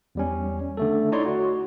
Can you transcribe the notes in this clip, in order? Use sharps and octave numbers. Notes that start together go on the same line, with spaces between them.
E2 G3 C#4
D3 A3 A4
D#4 E4 C#5 D5 A#5 C6
F#4